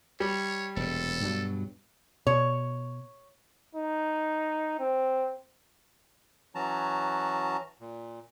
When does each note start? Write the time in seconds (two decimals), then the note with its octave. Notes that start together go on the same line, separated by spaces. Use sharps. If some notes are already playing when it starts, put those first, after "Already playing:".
0.20 G3 C#5
0.77 E1 A#2 A4
1.21 G2 B2 F#3
2.27 B2 C#5
3.75 D#4
4.80 C4
6.55 E3 F#3 C#4 F#4 A5 A#5
7.81 A#2